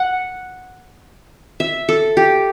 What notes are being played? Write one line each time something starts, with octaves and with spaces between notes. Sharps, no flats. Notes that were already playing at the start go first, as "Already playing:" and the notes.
Already playing: F#5
E5
A4
G4